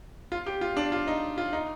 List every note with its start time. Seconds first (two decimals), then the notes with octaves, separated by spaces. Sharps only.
0.32 F4
0.46 G4
0.61 F4
0.77 D4
0.92 F4
1.07 D#4
1.38 F4
1.53 D#4